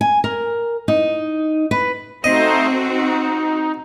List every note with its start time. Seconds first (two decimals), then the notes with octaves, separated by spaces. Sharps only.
0.01 G#5
0.24 A#4
0.88 D#4
1.71 B4
2.24 A3 C4 D#4 F#4 C5 D#5
2.87 D#4